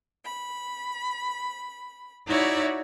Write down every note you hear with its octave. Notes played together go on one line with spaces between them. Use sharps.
B5
D#4 E4 F#4 C#5 D5 E5